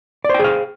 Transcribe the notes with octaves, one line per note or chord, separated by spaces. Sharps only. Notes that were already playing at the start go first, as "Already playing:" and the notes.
G#4 C5 D5 F5 G5